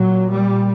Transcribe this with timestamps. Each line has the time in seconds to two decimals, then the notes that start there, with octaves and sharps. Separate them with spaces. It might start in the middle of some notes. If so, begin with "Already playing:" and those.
Already playing: A#2 F#3
0.29 G3